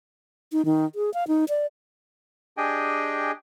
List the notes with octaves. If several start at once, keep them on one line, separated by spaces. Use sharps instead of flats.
D#4
D#3
G#4
F5
D#4
D5
D4 G4 G#4 D#5 G5 G#5